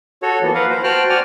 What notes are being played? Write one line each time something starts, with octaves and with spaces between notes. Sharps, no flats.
F#4 A4 C#5
E3 F3 A#3 B3
A#4 B4 F5 F#5
C5
F#4 C5 G5 A5 F6 F#6
D5 F#5 G#5 F6